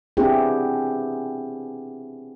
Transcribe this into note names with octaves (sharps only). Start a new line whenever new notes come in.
B3 C4 D4 E4 G4 G#4